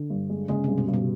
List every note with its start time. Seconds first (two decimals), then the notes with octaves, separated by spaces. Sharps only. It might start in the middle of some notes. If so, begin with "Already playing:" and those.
Already playing: D3
0.10 G2
0.30 G#3
0.48 C#3 G#3
0.64 G2 C3
0.78 B2
0.88 G2
0.94 B2